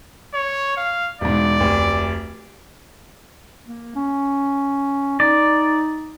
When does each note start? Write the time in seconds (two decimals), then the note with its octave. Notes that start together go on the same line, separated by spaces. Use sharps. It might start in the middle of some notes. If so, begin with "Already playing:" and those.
0.34 C#5
0.77 F5
1.21 E1 G#2 D5
1.60 F1 D2
3.67 A#3
3.95 C#4
5.20 D#4 D5